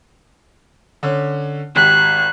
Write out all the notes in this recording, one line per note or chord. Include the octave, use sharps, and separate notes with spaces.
D3 C#4
G#1 G4 F#6 B6